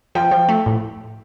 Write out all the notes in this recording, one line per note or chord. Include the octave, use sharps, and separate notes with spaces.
F3 G5
F3
A3
A2